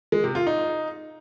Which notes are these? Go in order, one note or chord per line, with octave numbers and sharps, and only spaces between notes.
G#3
C3
F4
D#4